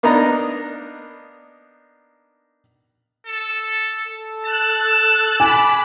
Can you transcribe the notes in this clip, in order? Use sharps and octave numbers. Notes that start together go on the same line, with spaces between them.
A#3 B3 D4 D#4 D#5 A#5
A4
A4
A5 F#6
G#5 B5 D6